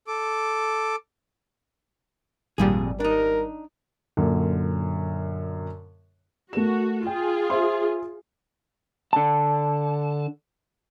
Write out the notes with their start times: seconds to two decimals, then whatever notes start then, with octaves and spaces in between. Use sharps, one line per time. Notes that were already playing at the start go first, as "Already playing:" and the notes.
0.07 A4 D6
2.58 G#1 F2 A#2 G3 G#4
3.00 D4 D#4 A#4
4.17 F#2 A#2 D3
6.53 A3 F#4 A#4 E7
7.07 F4 G#4 G5
7.50 C5 E5 C6
9.13 D3 A5